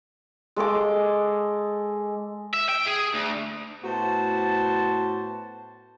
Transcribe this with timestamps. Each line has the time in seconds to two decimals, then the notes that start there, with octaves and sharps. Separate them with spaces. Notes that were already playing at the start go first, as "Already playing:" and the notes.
0.56 G#3 A4 D#5 D6
2.54 E5
2.69 G5
2.86 G#4
3.14 D2
3.84 A2 B3 F#4 C5 A5